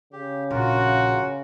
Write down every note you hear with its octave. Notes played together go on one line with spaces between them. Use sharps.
C#3 G4
A#1 F4 F#4 A#4